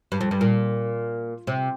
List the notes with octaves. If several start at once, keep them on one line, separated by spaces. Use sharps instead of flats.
G2
F2
G2
A#2
C3